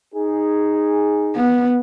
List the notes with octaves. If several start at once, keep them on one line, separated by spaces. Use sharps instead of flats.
D#4 G#4
B3